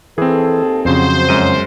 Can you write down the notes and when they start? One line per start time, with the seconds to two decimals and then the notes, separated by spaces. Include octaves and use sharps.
0.18 D#2 E3 C4 G#4 A4
0.85 F2 C#3 F#3 C5
1.29 F#2 F#3 G#3 D#7